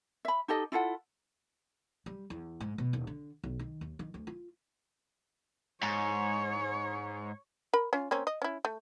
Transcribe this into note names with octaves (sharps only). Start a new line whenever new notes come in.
E5 B5
D#4 G4 A4 D#5
E4 F4 A4 F#5
G3
E2
G#2
B2
D#1
D3
B1
D#3
D#2
D#3
D2
F4
G#2 C#5
A#4 B5
C#4 F4
A#3 C4 C#4
D#5
C#4 E4
A3